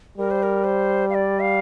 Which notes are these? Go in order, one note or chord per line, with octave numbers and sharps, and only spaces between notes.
G3 A#4
C5
A#4
C5
F5
D5
F5